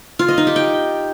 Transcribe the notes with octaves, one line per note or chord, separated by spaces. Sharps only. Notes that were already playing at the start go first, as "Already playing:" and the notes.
F4
D#5
D#4
G4
G5